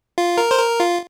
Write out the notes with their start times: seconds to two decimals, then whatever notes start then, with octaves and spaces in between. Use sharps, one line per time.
0.18 F4
0.38 A#4
0.51 C5
0.59 A#4
0.80 F4